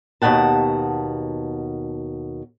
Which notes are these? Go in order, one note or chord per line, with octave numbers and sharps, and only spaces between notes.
D#2 G#2 B2 F#5 A5